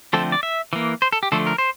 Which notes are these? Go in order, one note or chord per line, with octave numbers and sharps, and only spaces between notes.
D3 F3 A3 C4 A4
D5
E5
E3 A#3
C5
A4
G4
D3 F3 A3 A4
A#4
C5